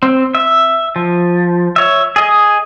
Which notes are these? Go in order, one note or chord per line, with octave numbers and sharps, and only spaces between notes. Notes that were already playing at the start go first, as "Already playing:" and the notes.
C4
E5
F3
C#5 E5
G#4 D#5